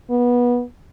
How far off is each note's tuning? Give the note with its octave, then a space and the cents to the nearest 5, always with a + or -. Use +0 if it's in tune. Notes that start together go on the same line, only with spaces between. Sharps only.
B3 -20